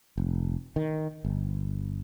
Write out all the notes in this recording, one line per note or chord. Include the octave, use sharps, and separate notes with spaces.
F1
D#3
G1